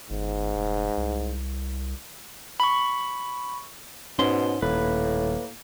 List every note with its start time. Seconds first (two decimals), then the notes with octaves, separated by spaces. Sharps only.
0.10 G1 G#2
0.55 F1
0.97 C2
2.60 B5 C#6
4.19 G#2 B2 C#4 C6
4.62 D#1 A2 A#3 B4